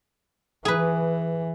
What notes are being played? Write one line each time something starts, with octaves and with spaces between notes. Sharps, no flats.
E3 G#4 B4